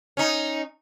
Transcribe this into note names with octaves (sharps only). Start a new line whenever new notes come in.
C#4 D#4